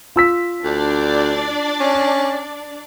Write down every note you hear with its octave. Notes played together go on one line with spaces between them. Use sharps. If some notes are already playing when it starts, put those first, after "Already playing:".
F4 E6 B6
D2 D4 D5
C#4